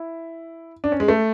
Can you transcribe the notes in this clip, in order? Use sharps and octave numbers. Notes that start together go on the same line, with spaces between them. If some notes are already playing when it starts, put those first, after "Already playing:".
Already playing: E4
D4
C#4
G#3
A3